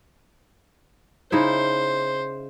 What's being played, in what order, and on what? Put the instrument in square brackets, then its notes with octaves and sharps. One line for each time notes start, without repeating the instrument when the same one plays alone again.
[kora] C#3 D#4 E4 [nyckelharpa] C5